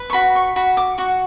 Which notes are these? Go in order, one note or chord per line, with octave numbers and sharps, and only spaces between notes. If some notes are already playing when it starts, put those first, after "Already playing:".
Already playing: B4
C#6
F#4 B5
C#6
F#4 B5
D6
F#4 C#6